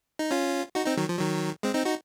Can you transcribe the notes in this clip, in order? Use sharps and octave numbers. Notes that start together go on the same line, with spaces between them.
D#4
C#4 F4
D#4 F#4
C4 D#4
D#3 F#3
F3
D#3 F#3
G#3 C4
C4 D#4
D#4 F#4